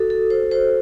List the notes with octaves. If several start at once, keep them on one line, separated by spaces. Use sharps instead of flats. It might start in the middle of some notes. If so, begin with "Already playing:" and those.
Already playing: F#4 A4
A4
C5
C5